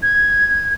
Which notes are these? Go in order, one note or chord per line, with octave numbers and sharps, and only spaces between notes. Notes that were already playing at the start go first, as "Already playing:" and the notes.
G#6